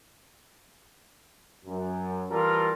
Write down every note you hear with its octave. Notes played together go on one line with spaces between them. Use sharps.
F#2
E3 G3 F4 A4 A#4